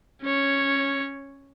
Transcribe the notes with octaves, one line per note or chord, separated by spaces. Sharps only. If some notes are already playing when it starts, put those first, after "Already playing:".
C#4 C#5